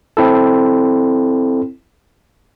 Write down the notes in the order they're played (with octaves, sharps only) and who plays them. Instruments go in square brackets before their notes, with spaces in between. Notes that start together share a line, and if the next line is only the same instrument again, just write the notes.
[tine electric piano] C4 E4 A4